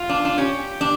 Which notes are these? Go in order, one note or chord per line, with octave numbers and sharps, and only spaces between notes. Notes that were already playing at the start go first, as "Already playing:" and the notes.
Already playing: F4
D4
D4
C#4 G4
D4